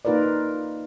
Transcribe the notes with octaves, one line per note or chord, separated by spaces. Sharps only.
A#3 D#4 F4 A#4 B4 D5